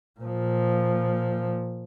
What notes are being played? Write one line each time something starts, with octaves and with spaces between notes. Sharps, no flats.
A#2 F3